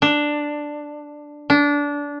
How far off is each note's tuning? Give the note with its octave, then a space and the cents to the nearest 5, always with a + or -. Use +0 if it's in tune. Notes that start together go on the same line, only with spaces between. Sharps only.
D4 +5
D4 -20